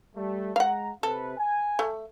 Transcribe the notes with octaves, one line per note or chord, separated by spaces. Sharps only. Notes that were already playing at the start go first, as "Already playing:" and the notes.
G3 A3
G#3 F5 F#5 A#5
C3 A4 B4
G#5
A3